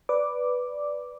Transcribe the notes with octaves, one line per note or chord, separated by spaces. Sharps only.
B4 D5 D6